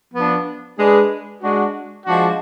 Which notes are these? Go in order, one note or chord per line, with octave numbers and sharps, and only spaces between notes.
F3 B3 D4
G#3 D4 G#4 B4
G#3 D4 F#4
F3 G#3 D4 F#4